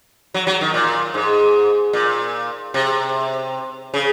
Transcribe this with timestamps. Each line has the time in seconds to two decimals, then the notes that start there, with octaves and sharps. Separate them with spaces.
0.34 F#3
0.47 F#3
0.61 D#3
0.74 A#2
1.14 G#2
1.93 A#2
2.74 C3
3.94 C#3